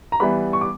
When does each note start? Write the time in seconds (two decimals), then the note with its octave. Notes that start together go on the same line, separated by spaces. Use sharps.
0.12 A#5
0.20 E3 G3 B3 B5
0.53 C#6
0.61 D6